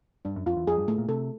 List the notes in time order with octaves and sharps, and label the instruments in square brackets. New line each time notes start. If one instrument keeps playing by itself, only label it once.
[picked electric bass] G2 [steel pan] D4
[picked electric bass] F#2
[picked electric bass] F2 [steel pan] F4
[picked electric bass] E2
[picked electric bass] F2 [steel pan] G#4
[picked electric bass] G2
[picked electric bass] A2 [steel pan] A3
[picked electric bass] A#2
[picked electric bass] C3 [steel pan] A4